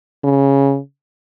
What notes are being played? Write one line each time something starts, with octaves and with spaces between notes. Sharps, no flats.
C#3